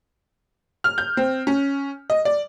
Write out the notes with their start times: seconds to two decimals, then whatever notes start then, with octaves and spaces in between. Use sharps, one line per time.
0.84 F6
0.98 G6
1.17 C4
1.47 C#4
2.10 D#5
2.25 D5